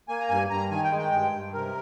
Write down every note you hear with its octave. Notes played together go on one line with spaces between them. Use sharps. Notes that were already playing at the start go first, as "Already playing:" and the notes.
A#3 G#5
A#5
G2 G#5
G2 A#5
D#3 G#5
G5
G#3
G5
G2
G2
C3 A#4